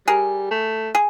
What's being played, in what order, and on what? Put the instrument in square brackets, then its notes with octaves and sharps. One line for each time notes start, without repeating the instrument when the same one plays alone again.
[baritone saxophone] G3 [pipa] G#4 A#4
[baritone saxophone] A3
[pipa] G#4